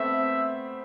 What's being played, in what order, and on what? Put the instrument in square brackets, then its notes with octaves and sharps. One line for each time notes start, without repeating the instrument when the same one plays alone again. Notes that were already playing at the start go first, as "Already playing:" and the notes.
Already playing: [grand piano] A3 B3 C4 [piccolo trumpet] E5